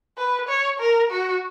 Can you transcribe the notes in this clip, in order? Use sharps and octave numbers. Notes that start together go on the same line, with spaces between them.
B4
C#5
A#4
F#4